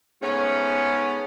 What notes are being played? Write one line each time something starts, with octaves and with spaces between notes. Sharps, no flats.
G#2 A3 B3 C#4